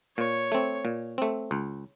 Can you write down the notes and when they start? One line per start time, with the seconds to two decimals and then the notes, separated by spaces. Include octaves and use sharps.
0.18 A#2 C#5
0.52 A3 C4
0.85 A#2
1.18 A3 C4
1.51 C#2